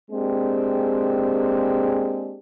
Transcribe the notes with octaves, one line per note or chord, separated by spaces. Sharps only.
G#3 A#3 C4 D4 G4 G#4